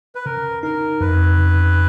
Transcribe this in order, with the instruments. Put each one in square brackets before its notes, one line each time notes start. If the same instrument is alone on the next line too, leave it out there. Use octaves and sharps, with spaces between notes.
[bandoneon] B4
[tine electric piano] C#3 [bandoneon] A#4
[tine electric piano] D#4 [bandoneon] A#4
[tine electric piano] F2 [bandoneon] B4
[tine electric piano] C#3